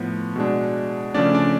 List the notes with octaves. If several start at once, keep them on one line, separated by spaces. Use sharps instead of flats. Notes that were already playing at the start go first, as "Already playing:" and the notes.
Already playing: A2 F3 B3
B2 G#3 D4
C#3 F3 A3 C#4 D4 D5
D4 D5